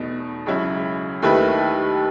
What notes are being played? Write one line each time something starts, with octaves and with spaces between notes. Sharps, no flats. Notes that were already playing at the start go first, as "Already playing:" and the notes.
Already playing: E2 B2 A3 D#4
C#2 C#3 F#3 C#4 E4
D#2 D#3 A3 E4 B4